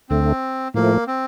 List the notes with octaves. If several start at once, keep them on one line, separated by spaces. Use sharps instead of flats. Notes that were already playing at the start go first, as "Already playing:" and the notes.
D2 D3 A3 C4
A2 F3 A3 A#3
C4